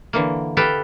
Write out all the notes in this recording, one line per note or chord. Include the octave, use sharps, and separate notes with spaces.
D3 E3 A#3
G4 A4 B4 F5 G5